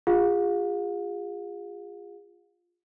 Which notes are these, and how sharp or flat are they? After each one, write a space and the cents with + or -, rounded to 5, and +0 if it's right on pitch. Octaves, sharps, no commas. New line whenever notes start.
F4 +0 G#4 -35 F5 +40